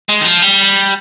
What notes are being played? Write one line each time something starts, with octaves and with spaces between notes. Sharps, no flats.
G#3
D#3
F3
G3